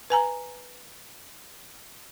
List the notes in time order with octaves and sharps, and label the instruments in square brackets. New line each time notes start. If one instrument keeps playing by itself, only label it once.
[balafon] B4 G#5 A#5